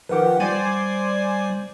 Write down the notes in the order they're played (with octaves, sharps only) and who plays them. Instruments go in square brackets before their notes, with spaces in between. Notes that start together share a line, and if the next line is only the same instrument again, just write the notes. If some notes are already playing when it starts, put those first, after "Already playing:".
[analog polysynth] D#3 F3 G4 [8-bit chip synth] B4 F#5
[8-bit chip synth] G3 [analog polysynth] C5 D5 G#5